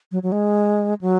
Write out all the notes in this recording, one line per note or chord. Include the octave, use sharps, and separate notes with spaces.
F#3
F#3
G#3
F#3